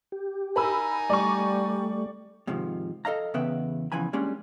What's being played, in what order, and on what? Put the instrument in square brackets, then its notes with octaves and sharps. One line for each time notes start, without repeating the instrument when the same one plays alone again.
[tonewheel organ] G4
[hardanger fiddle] D#4 G#5 [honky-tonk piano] A#4 B5 E6
[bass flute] G3 [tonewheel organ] A3 [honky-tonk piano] D5 C#6
[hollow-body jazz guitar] G#2 C3 D#3 F3
A4 D#5 F5 A#5
E2 C#3 B3 B4 E5 G5
E2 C#3 E3 F3 G#5 B5
G3 G#3 A#3 C#4 D4